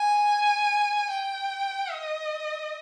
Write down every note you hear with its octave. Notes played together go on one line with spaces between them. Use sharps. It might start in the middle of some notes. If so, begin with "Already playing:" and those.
Already playing: G#5
G5
D#5